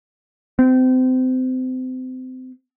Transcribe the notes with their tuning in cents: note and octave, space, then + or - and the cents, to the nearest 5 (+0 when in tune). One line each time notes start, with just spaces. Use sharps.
C4 -30